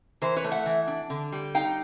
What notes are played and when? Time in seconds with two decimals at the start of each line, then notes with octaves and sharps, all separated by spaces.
0.22 E3 A#4 C5
0.37 B4 C#5
0.44 A3
0.51 E5 F#5
0.66 E3
0.88 D4
1.10 D3
1.32 G3
1.55 D#4 F5 G5